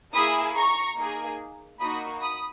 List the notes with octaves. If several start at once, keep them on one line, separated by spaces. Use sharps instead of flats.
A#3 E4 G#4 B5 D#6
A#5 C#6
A#3 D#4 G#4
A#3 D#4 F#4 B5 D#6
B5 D#6